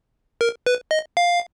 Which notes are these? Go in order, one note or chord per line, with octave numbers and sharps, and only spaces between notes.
A#4
B4
D#5
F5